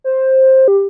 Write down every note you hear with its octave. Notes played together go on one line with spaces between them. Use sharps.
C5
G4